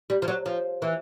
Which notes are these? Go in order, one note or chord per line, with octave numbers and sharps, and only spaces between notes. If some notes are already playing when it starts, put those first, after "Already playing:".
G3
F3
F#3
F3
E3